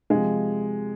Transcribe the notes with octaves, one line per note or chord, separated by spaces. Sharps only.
C3 F3 G#3